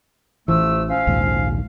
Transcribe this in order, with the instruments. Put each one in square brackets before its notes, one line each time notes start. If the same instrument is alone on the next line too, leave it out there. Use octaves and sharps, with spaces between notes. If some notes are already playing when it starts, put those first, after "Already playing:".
[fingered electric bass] A1 E3 [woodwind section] F3 A3 E6
[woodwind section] F3 C#4 F5
[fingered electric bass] A#1 D#2 G#2